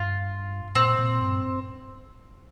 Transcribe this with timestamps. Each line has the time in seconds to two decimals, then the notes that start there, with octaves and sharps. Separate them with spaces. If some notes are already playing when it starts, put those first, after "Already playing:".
Already playing: G2 F4
0.75 A#2 C4
0.99 A#2
1.21 G2